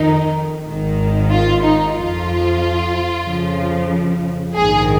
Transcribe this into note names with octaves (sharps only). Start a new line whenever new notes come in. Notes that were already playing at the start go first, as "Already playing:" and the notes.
Already playing: F2 D#3 D#4
G#1 G#2 D#3
F4
D#4
F2 F3 F4
F2 C#3 F3
A#1 G#2 D#3 G#4